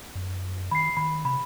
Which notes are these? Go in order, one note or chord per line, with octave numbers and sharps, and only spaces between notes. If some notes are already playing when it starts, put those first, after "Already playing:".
F#2
D#3 B5 C7
D#3 B5
C3 B5